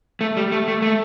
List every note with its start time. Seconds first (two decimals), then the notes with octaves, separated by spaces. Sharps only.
0.21 A3
0.37 G3
0.52 A3
0.68 A3
0.82 A3